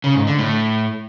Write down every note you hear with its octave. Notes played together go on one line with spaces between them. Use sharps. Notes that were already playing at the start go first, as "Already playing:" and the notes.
C#3
G#2
D3
A2